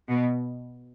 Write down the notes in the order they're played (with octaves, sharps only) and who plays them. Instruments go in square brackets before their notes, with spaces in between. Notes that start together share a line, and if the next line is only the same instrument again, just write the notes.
[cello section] B2